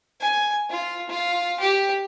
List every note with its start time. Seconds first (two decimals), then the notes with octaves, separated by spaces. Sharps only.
0.21 G#5
0.70 F4
1.09 F4
1.60 G4